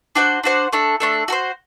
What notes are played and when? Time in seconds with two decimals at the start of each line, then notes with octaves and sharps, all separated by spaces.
0.15 D4 F#4 C5 F#5
0.43 D4 F#4 C5 F#5
0.73 A3 D4 A4
1.00 A3 D4 A4
1.28 F#4 A4
1.32 C5